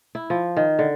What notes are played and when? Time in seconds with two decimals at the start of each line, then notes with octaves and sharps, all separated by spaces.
0.15 E4
0.30 F3
0.57 D#3
0.79 D3